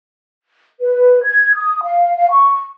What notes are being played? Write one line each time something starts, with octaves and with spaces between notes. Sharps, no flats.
B4
G#6
D#6
F5
F5
C#6